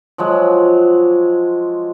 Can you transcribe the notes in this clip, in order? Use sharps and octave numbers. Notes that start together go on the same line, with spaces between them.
F3 F#3 G#3